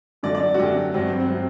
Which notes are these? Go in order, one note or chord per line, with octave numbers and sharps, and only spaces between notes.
F#2 D3 F#3 D5
D5
F#4
F#2 D3 F#3 G4
G2 F#3 C4
C4
F#3